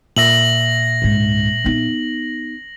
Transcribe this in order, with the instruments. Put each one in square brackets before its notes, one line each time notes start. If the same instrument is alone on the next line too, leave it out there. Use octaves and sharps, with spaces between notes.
[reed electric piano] A#2 E5 [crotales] A#6 F#7
[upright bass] C#2 G#2
B3 D#4